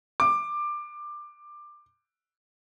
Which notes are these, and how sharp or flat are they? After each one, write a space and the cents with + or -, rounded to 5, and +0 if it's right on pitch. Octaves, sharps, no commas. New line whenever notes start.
D6 +15